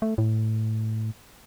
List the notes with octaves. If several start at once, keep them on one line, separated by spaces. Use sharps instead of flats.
A3
A2